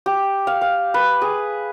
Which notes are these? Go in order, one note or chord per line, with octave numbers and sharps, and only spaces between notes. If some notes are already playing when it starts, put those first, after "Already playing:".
G4
F5
F5
B4
G#4